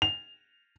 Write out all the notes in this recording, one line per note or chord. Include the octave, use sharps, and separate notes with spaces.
F7